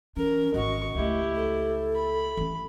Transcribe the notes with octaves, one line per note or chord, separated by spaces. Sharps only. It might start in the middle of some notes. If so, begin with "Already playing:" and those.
E3 C#4 A#4
G#1 F#4 D#5 C#6
C#2 A3 E4 G4
A4
B5
E3 C#4